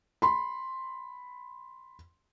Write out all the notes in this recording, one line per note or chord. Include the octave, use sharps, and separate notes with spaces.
B5 C6